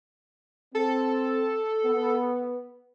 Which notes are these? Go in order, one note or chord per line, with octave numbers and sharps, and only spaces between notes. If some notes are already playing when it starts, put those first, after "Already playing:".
C4 A4
B3